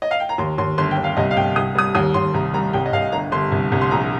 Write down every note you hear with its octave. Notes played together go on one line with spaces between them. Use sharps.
D#5
F5
G5
A#5
D#2 C6
D#2 C6
G1 C6
G5
G1
F5
C2 D#5
F5
C2 G5
C2 D#6
G3 D#6
D#2 D#6
D#2 C6
C2 A#5
G3 A#5
C2 G5
D#5
C2 F5
G1 A#5
G1 C6
C2
C2
C6
A#1 A#5